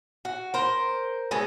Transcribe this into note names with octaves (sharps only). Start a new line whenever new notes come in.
F#4
A#4 C5
B2 G#3 A4